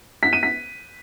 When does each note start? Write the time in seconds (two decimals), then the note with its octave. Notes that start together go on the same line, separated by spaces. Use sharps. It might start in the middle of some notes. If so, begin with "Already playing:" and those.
0.23 B6
0.33 D#7
0.43 B6